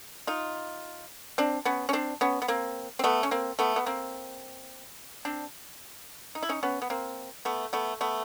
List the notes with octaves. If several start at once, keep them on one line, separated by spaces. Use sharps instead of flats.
D#4 F4
C4 D4
B3 C#4
C#4
C4 D4
B3 C#4
B3
A#3 C4
C4
A3 B3
C#4
A#3 C4
A3 B3
B3
A#3 C4
C4 D4
D#4
E4
C#4 D#4
B3 C#4
B3
A#3 C4
A3 B3
A3 B3
A3 B3